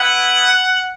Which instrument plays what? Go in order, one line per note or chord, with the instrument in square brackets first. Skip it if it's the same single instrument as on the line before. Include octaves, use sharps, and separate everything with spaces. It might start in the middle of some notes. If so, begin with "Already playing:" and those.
Already playing: [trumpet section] B3 E4 F#5